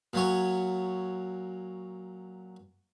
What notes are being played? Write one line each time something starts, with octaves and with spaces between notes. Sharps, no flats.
A#2 F#3 C#5